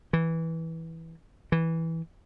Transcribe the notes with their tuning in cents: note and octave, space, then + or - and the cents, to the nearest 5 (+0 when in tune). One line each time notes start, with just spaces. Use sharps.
E3 -10
E3 -10